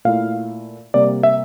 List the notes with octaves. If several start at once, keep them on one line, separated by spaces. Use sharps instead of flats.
A#2 A3 E4 F5
C3 G3 A#3 D5
E5